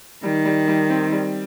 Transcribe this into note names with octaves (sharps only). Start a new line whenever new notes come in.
D#3 G3
G3
G3
C4
G3